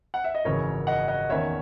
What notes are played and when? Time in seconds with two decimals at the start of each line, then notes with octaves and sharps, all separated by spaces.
0.14 F#5
0.24 E5
0.35 D#5
0.45 G#1 F#2 C#3 E3 A#4 C#5
0.87 D#5 F#5
1.08 D#5 F#5
1.29 E2 D#3 A#3 C#4 C#5 E5